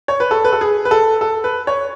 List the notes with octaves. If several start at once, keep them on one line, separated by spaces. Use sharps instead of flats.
C#5
B4
A4
B4
A4
G#4
B4
A4
A4
B4
C#5